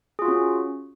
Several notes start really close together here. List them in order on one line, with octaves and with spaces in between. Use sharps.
G#4 F4 F#4 C#4